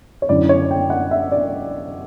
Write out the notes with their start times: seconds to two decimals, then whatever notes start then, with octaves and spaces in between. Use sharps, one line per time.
0.22 C#5
0.29 F#2 D3 F#3 C#4 E4 D5
0.49 C#5
0.71 G5
0.90 F#5
1.11 E5
1.32 D5